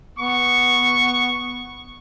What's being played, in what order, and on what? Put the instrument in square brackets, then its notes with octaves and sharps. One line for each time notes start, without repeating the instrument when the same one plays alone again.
[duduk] B3 [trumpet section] C#6